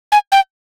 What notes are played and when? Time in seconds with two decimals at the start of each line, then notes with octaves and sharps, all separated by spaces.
0.12 G#5
0.32 G5